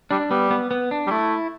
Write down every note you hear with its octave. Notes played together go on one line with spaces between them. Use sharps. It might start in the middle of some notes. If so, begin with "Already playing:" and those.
G3 D4
G3 B3
B3
B3
D4
G3
A3 E4